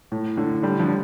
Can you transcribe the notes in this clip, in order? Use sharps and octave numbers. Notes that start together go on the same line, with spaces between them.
A2
A2 D3
D3 G3
D3 F3
G3